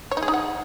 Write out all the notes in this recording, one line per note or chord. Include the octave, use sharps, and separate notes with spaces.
C#5
D#4
G#4
D#4
F#5